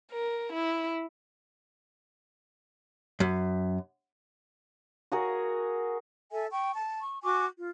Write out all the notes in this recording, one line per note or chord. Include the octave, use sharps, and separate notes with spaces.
A#4
E4
F#2
F#4 G#4 A#4
A4 E5 G#5
G5 C#6
A5
C#6
F#4 G#5 C#6 D6
F4